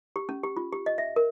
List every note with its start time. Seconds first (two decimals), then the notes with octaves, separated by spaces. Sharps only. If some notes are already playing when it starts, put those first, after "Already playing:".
0.16 G4
0.29 C#4
0.44 G4
0.57 F4
0.73 G4
0.86 D#5
0.98 E5
1.16 A#4